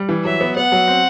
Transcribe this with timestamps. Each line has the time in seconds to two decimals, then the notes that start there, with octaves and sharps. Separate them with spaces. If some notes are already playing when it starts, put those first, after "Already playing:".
Already playing: G3
0.09 E3
0.25 F#3 E5
0.41 B3
0.56 B3 F#5
0.72 F#3
0.88 C4